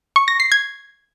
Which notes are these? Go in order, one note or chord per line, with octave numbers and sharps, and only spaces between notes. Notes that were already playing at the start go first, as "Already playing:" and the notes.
C#6
A#6
C7
G#6